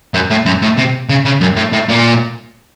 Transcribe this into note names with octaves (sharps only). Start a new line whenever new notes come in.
F#2
A2
F#2
A2
C3
C#3
C#3
F#2
A2
A2
A#2